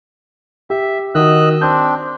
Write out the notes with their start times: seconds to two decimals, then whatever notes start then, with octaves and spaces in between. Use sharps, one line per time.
0.70 G4 E5
1.15 D#3 F#4 D#5 E6 F#6
1.61 C4 D4 G6